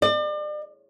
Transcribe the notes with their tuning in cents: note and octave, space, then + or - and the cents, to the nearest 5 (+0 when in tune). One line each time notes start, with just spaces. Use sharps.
D5 +40